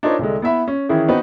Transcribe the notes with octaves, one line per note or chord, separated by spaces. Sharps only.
D4 D#4 F4 A#4 C5 C#5
C2 D3 G#3
B3 E4 E5 B5
C#4
D#3 E3 C#4 E4 G#4
B3 C4 D#4 F#4 B4